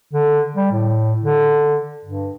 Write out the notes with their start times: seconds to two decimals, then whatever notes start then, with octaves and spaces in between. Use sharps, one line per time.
0.14 D3
0.56 G3
0.72 A2
1.23 D3
2.05 G2